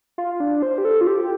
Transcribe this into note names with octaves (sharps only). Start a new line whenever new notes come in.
F4
D4
C5
G4
A4
F4
G4